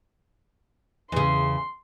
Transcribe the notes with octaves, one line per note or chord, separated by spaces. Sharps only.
E2 C#3 C6